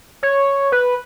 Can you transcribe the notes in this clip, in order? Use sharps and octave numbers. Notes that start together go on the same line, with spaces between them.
C#5
B4